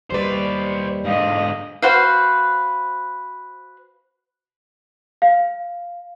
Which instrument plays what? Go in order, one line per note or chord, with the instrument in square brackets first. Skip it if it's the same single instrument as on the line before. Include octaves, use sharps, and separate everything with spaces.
[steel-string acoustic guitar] D#2 G3 B4 [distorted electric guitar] C5 D5
[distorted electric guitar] G#2 D3 [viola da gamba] D#5 [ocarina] F5
[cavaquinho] F#4 B4 C5 F5
[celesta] F5